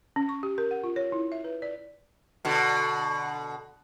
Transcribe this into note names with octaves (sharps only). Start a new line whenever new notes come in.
C#4
C#6
G4
A#4
F#5
F4
C#5
E4
E5
B4
D5
B2 D3